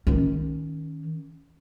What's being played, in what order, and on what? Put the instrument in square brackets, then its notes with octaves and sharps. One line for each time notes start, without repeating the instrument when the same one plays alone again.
[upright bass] D#3 C#4